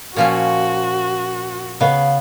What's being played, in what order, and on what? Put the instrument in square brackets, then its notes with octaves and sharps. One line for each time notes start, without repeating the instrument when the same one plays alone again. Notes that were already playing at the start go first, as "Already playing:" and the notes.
[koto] A#2 F3 C#4 [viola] F#4
[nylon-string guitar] C#3 F5 [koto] B3